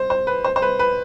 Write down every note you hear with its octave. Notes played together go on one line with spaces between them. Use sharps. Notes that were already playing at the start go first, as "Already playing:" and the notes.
Already playing: C5
C5
B4
C5
C5
B4
B4